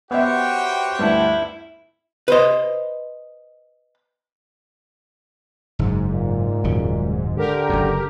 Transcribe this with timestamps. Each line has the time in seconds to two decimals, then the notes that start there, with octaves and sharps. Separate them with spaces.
0.11 B3 F#4 G4 C5 C#5 E5 F#5 G5
0.99 D2 G2 E4
2.28 B4 C5 D#5
5.79 F#1 G#2
6.12 A#2
6.64 D#1 F#2 C#3
7.36 D3 G4 A#4
7.69 F#1 F#2